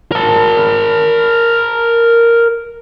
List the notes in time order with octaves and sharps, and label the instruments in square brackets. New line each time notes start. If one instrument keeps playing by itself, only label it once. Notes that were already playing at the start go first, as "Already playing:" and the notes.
[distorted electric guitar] A#4 A5